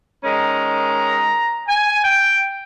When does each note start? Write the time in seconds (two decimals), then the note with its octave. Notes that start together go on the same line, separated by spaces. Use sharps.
0.24 D#3 G#3 C#4 A#5
1.68 G#5
2.04 G5